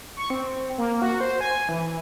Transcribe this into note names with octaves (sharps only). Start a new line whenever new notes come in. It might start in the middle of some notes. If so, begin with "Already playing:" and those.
C#6
C4
A#3
F#4
C5
G#5
E3